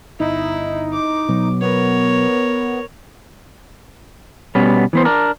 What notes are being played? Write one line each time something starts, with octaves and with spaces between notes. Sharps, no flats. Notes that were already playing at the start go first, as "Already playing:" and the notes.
G1 D#4 E4
D6
B2 F#3
B3 A#4 C#5
B2 G3 B3 C#4
E3 B3 C5
D4 A#4